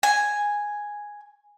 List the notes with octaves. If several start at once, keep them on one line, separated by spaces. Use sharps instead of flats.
G#5